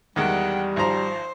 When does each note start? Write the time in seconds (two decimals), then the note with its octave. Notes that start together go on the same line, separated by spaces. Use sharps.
0.16 E2 D#3 G3 G#3 F#5 G5
0.76 G#1 F3 C5 A#5